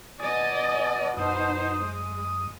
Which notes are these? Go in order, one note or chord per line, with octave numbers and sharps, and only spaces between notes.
B2 D5 D#5 G#5 D#6 A6
F#2 D#4 C5 D#6
G#3